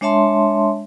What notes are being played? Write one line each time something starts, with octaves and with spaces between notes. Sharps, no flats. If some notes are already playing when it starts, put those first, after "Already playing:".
G#3 D4 C#5 E5 A5 C6